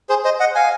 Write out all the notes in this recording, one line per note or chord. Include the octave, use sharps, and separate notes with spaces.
G#4 C5
C5 D#5
D#5 F#5
F5 G#5